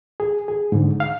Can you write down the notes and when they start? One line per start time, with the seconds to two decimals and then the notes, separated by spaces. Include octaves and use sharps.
0.20 G#4
0.48 G#4
0.72 G#2 D3
1.00 F5